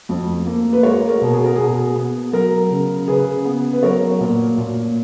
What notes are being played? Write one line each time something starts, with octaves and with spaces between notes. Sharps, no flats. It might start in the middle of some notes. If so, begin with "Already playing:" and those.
F2
A#3
B4
G#3 A#4 C#5
A#4
B2
G#4
A#4
B2 G#4
B3
F#3 A#4
C#3
C#3 G#4 B4
B3
B4
F#3 A#4 C#5
A#2
A#2